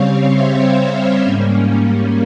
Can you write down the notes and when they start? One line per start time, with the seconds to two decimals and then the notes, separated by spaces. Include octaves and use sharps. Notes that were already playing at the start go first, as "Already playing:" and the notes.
Already playing: C#3 G3 C4 C#5 F5
0.33 C5 E5
1.21 G#2 G3 A#3 C#4